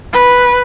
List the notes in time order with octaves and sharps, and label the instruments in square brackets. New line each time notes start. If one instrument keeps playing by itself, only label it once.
[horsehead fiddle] B4